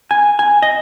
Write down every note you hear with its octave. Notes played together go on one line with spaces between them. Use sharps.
G#5
G#5
D#5